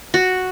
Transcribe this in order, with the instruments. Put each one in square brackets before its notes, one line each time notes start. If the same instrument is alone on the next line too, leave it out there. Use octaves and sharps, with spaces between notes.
[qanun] F#4